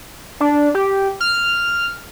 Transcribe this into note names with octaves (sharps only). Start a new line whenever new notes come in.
D4
G4
F6